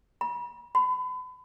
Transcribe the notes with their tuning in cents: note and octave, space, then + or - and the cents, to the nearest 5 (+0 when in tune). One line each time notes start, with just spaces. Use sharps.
B5 -40
B5 +35